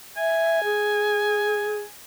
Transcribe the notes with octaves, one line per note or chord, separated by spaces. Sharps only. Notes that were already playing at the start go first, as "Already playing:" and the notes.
E5 G#5
G#4